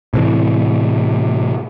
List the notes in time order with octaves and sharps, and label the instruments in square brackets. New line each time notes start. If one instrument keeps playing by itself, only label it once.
[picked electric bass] A2 C3 E3